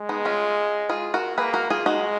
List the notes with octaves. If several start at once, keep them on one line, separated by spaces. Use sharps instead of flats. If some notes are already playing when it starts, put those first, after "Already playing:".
Already playing: G#3
B3 D#4
C#4 F4
F4 G#4
F#4 A#4
A#3 G#4 B4
F#4 A#4
F4 G#4
G#3 D#4 F#4